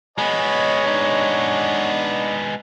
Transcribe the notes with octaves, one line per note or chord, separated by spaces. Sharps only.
G#3 B3 C#5 D#5 G#5 B5
D4 D#4